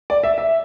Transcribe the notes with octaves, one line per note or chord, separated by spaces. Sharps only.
D5
E5
E5